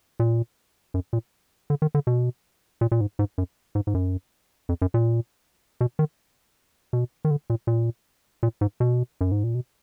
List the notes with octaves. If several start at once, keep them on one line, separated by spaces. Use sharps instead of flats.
A#2
F#2
A#2
D3
D#3
D3
B2
A#2
A#2
G#2
G#2
F#2
G#2
G#2
F#2
F2
F#2
A#2
B2
D#3
B2
D#3
D3
A#2
A#2
A#2
G#2
B2
F#2
G#2
A#2
B2